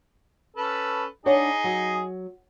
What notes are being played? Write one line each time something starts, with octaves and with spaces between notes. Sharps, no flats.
C#4 A4 B4
D4 D#4 G#4 C#5 D#5 F#5
F#3